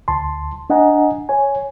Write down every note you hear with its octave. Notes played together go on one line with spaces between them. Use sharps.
D2 A5 C6
D4 D#5 F#5 G#5 A#5
C#5 G#5